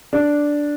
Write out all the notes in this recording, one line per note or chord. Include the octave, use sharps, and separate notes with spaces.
D4